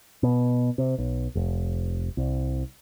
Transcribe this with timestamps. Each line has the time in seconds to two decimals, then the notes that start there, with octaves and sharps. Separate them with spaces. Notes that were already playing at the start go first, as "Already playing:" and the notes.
0.23 B2
0.78 C3
0.98 B1
1.35 F1
2.17 C2